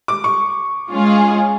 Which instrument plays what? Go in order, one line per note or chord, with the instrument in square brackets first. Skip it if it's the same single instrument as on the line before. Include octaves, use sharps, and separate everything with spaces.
[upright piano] D6
C#6
[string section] G#3 C#4 F4 G#4